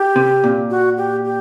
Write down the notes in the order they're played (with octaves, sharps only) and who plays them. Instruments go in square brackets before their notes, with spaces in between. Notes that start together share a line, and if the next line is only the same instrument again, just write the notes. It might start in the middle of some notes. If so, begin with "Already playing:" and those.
Already playing: [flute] G4
[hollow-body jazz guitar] C3
A#2
[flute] F#4
G4
G4